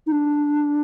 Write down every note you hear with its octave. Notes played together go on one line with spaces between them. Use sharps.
D#4
D4